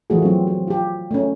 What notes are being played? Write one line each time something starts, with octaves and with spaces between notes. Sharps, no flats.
E3 F3 A3 F4 F#4 G#4
F#3 C4
C4
F4 G4
A3 C#4